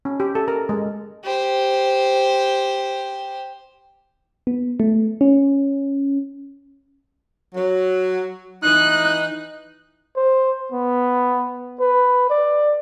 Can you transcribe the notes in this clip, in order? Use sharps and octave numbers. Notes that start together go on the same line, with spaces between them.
C#4
G4
A4
A#4
G#3
G4 C5
B3
A3
C#4
F#3
E3 D#4 F#6
C5
B3
B4
D5